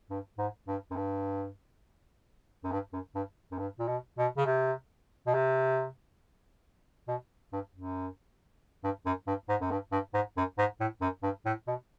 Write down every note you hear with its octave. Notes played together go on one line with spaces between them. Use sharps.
G2
G#2
G2
F#2
G2
F#2
G2
F#2
G2
F#2
G2
A#2
B2
B2
C#3
C3
B2
C3
B2
G2
F#2
G2
F#2
G2
G#2
F#2
G2
G2
G#2
F#2
G#2
A2
F#2
G2
A2
B2